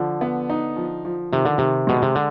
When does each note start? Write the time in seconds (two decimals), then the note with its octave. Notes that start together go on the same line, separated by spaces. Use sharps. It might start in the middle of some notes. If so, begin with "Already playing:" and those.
Already playing: D3 F3
0.21 B3
0.50 D#4
0.76 F3
1.05 F3
1.33 C3 D#3
1.45 D3
1.58 C3 D#3
1.87 B2 G#3
2.02 C3
2.15 D3